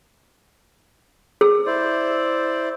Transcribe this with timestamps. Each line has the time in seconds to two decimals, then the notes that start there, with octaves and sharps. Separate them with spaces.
1.41 G#4
1.66 E4 C5 D5